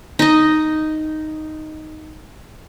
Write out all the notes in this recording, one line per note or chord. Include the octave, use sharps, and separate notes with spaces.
D#4 D#5